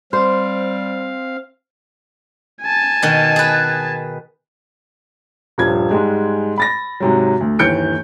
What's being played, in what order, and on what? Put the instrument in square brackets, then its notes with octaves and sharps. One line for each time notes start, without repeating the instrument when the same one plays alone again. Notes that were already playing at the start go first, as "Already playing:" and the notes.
[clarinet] G3 [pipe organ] C4 F5 [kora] C5
[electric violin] G#5 A5
[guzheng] B2 D#3
G#4 B4
[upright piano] D#1 G2 F3 G#6
G#2 G3 G#3
B5 A6 A#6
G#2 C3 F#3
D2
G1 D#2 E3 G6 C#7 D7